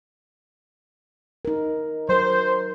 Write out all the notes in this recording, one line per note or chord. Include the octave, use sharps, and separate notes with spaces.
D#4 A#4
F#3 A#4 C5